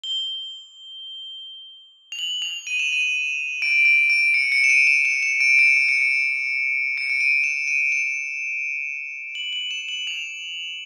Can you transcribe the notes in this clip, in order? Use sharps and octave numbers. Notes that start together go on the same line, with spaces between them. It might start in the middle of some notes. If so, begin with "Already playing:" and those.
G7
F7
F#7
F7
D#7
E7
D#7
D7
D7
D7
C#7
C#7
E7
D#7
E7
E7
E7
D7
C#7
D7
C#7
D7
C#7
D7
D#7
E7
D#7
E7
F#7
F#7
E7
F#7
F7